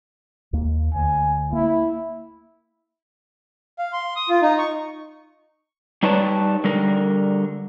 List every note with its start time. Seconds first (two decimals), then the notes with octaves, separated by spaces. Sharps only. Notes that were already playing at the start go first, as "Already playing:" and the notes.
0.53 D#2 A#3
0.95 D2 G#5
1.53 A#3 E4
3.79 F5
3.93 C6
4.16 D#6
4.29 F4
4.42 D#4
4.58 C#6
6.03 G3 D#4 B4 C#5 D5 A5
6.64 D3 G3 A#4